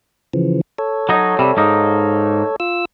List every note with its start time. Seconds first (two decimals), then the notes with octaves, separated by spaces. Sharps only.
0.33 C#3 E3 F3
0.78 A4 C#5
1.09 F#3 D#4
1.39 C3 G3
1.57 G#2 A#3 D#4
2.60 F4 E6